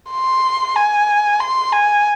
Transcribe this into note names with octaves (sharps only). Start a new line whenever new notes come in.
C6
G#5
C6
G#5